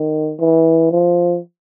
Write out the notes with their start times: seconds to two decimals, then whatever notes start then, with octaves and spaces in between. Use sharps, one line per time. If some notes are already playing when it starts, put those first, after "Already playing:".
Already playing: D#3
0.40 E3
0.91 F3